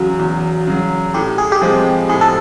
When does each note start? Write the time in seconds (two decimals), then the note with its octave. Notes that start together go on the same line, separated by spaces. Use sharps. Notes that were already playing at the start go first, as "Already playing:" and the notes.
Already playing: E2 C#3 F#3 F#4
0.19 E2
0.67 C#3 F#3
1.14 A2 G4
1.38 G#4
1.52 G4
1.61 F3 G#3 C4 G#4
2.09 A2 G#4
2.21 A4